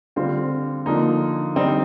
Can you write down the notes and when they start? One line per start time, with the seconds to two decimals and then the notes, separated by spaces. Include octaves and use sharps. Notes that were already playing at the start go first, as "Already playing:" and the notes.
0.16 D3 G3 C4 F4
0.86 D3 F3 A#3 D#4
1.55 D3 G3 C4 D#4